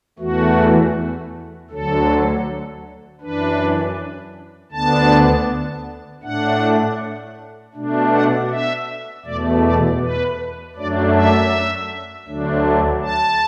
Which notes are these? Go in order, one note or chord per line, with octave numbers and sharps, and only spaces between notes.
E2 E3 A3 F#4
D2 D3 F#3 A4
F#2 E3 D4 B4
D2 D3 B3 D4 A5
A2 A3 D4 F#5
B2 A3 D4
F#5
E5
E2 B2 A3 D5
D5
B4
F#2 F#3 A3 D4 D5
E5
D2 D3 F#3 A3 D4
A5